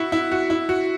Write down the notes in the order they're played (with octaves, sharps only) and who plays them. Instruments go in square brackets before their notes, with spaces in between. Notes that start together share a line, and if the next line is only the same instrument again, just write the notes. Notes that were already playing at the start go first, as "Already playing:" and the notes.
Already playing: [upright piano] E4 F#4
E4
F#4
E4
F#4